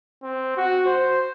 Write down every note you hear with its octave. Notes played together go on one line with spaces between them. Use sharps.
C4
F#4
C5